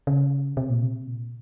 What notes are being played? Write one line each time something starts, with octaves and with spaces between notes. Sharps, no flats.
C#3
C3
A#2
C3
A#2